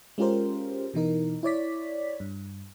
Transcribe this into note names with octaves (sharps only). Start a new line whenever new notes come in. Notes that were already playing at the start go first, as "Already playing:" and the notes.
G#3 C#4 F4 G4 A#4 C5
B2 E3 D#4 A#4
E4 C#5 D5 B6
G2